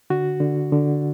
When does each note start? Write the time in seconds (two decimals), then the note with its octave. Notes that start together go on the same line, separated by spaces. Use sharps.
0.10 D3 F#4
0.40 D3
0.72 D3